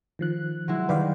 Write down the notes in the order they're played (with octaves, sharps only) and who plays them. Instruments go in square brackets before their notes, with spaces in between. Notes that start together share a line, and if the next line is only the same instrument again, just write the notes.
[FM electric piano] D#3 F3 F#6
[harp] F#3 G#3 E4
[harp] D#3 G3 [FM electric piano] B4 D5 F5